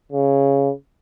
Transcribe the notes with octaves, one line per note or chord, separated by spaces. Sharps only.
C#3